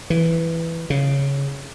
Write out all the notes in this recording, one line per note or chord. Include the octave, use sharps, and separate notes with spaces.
E3
C#3